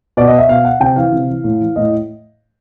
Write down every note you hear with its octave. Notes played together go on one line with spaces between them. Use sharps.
B2 D5
D#5
E5
B2 F5
F#5
C3 G5
E3 F5
C3
E3
A2
E3
A2 D#5